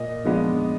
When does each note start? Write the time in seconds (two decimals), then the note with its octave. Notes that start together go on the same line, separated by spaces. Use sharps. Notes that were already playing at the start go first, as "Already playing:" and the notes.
Already playing: A#2 D#5
0.24 F3 G#3 B3 D4